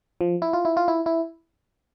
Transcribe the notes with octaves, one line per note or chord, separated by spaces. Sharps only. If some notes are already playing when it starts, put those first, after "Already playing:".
F3
E4
F4
E4
F4
E4
E4